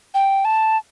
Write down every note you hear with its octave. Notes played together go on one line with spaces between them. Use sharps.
G5
A5